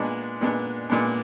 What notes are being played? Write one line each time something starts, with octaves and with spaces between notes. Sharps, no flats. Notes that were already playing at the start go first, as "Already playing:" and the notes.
Already playing: A#2 G#3 B3 D4
A#2 G#3 B3 D4
A#2 G#3 B3 D4